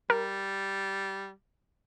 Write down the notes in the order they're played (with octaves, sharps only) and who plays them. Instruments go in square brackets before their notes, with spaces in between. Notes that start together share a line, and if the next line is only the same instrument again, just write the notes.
[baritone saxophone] G3 [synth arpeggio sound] A#4